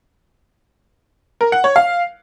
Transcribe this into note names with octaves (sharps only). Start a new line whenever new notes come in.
A#4
F#5
C#5
F5